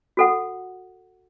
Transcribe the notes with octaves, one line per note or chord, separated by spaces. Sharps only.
F#4 A4 F#5